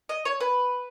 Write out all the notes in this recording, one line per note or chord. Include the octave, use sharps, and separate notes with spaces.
D#5
C#5
B4